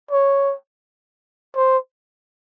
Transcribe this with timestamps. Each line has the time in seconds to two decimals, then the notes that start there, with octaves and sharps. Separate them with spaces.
0.11 C#5
1.56 C5